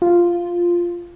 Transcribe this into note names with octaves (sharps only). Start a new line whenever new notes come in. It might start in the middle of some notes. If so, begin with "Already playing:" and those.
F4